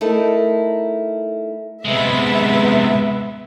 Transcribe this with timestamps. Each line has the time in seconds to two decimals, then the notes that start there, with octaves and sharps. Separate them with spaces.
0.01 A3 D#4 E4 A4 A#4
1.85 C3 G#3 B3 E5